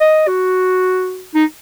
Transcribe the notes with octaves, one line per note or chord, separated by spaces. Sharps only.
D#5
F#4
D#4